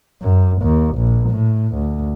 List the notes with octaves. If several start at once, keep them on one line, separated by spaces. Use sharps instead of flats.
F#2
D#2
A#1
A2
D2